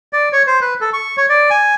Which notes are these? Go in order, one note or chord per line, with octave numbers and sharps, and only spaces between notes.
D5
C#5
C5
B4
A4
C#6
C#5
D5
G#5